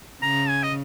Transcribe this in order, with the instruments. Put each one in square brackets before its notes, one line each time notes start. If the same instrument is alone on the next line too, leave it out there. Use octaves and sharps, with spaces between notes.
[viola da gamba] C#3 [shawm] A#5
[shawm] G#5
D#5